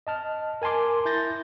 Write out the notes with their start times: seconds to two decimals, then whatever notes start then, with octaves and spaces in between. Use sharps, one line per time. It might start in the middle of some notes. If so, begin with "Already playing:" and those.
0.07 D#5 A5 F6
0.62 A#4 G#5 A5 C6 D6
1.05 E4 G6 A6 A#6